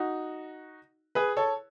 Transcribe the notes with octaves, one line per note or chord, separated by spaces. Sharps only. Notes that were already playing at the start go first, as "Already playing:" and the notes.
Already playing: D#4 F#4
G#4 B4
A4 C#5